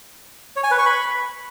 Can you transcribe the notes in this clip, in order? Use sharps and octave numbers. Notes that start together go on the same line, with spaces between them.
C#5
G#5
B4
C#6
B5